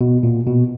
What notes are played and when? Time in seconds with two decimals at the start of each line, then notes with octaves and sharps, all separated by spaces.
0.01 B2
0.23 A#2
0.47 B2